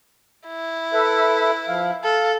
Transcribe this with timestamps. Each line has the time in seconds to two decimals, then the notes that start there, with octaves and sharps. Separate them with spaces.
0.48 E4
0.93 A4 B4 E5
1.68 F3 F5
2.04 A4 F5